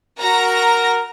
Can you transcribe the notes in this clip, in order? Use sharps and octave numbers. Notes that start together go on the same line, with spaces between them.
F#4 A#4 A#5 A#6